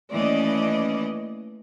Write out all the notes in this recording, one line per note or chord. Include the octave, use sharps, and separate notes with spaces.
D#2 E3 A3 C#4 D5 D#5